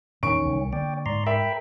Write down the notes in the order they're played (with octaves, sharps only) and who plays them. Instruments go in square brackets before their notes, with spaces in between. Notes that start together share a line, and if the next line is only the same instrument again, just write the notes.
[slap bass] E2 G2 A#2 [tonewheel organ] D#3 C#4 [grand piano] C#6 D7
[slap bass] C2
[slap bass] D3 A#3 [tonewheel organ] D5 G5
[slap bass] G#2 [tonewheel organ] D5 A#5 C6
[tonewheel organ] A#4 G5 B5 [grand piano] E5